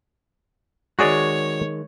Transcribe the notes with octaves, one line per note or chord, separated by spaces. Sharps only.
D#3 G#3 F#4 G#4 C#5 D5